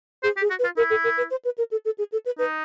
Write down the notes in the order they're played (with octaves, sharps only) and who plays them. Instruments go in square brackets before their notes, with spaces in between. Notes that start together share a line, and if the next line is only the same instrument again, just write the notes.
[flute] G#4 [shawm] C5
[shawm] G4
[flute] G#4
[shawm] F#4
[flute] B4
[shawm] F4
[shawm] E4 [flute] A#4
[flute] A4
A#4
B4
C5
B4
A#4
A4
A4
G#4
A4
B4
[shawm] D#4 [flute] B4